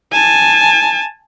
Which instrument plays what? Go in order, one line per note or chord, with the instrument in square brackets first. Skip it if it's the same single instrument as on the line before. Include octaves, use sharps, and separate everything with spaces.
[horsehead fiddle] G#5 A5